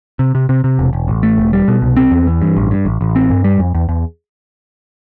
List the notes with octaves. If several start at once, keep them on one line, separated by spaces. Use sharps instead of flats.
C3
C3
C3
C3
E1
E1
A1
A3
E1
G3
B2
C2
C4
E2
E3
G2
A1
G2
A1
A1
C4
G2
G3
F2
E2
E2